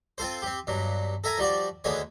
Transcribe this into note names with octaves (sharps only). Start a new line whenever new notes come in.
C4 F4 A4 C5
C4 G4
G2 B2 F#3
A4 A#4 E5 G#5 A#5
F3 G3 F#4 D5
D2 D3 G#3 B3 C#5